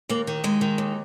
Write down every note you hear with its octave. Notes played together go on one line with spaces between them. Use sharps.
D#2 A#3
D#3
D#2 G#3
D#3
D#2